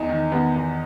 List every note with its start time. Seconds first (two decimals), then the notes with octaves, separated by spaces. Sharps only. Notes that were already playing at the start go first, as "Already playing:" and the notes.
Already playing: E2 D#4
0.09 D#3
0.32 D#3 B3
0.56 E2